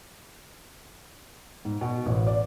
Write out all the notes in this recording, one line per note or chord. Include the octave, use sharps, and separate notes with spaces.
G#2
B2
A1
D5